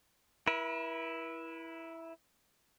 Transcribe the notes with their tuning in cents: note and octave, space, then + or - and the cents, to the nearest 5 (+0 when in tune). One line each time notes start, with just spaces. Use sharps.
E4 +0 B4 -45